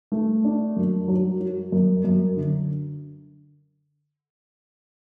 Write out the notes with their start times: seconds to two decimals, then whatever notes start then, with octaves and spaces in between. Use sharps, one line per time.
0.12 A3
0.44 D4
0.77 F#2
1.08 F#3
1.40 F#3
1.72 F#2
2.04 F#2
2.37 D3